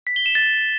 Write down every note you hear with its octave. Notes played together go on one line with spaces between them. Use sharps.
B6
G7
E7
A6